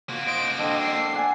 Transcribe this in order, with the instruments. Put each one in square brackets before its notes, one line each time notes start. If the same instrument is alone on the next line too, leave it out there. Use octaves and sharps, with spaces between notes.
[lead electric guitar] A#3 F#4 [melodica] F4
[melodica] C5 D#5 [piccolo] D7
[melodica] C4 A4 [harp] D4 [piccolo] D#5
[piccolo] C7
[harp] D5 F#5 G#5